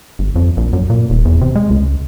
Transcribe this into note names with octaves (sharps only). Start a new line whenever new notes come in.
G1
F2
A#1
F#2
A#2
D#1
E2
C3
G#3
C#2